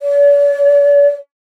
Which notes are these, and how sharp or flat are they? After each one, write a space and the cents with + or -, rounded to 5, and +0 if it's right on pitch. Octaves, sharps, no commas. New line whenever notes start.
D5 -45